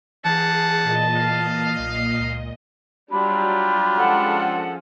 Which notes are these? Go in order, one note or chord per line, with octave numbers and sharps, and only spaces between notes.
E3 A#3 G#4 F#5 A5
A#2 D#5
F5
B1
C#2
F#3 G3 D4 F4 G4 B5
F3 G#3 C#4 A4 F#5